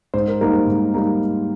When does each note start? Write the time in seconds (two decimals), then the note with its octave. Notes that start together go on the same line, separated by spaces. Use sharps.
0.14 G#2 C5
0.28 A#4
0.41 G3 A#3 D#4 A#4
0.54 C5
0.66 G#2
0.93 G3 A#3 D#4